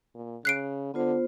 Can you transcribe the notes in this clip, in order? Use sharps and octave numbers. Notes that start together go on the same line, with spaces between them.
A#2
C#3 F#6 C7 D7
D3 B3 F4 C5